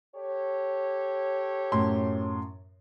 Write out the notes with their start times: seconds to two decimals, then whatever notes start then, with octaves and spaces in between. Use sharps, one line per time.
0.16 G4 A4 C#5
1.72 F#2 A2 C6